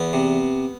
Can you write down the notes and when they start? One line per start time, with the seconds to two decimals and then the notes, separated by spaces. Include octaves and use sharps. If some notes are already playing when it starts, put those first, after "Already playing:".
Already playing: E2 B3
0.13 C3